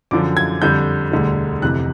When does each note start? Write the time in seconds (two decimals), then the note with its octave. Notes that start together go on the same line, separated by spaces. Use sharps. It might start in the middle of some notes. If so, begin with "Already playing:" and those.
0.11 F#2 D3 F3 D6
0.37 G#6
0.62 F2 D3 G3 G6
1.12 E1 D2 D3 G3
1.62 F1 F2 C3 E3 F#6